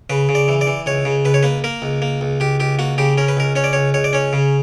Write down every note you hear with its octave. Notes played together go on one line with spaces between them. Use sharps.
C#3 B4
C#3
D5
E3
D5
E3
C#2 C#5
C#3
C#2 B4
C#5
A#3 B4
A#3 A#4
C#2
A#3
C#2
C#2 G4
C#2 G4
A#3 F#4
C#3 G4
C#4 A#4
B4
C#2 A#4
C#4 C#5
D5
C#2 C#5
C#2 C#5
D5
C#4 C#5
C#3